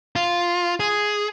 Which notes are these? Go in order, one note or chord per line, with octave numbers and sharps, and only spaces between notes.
F4
G#4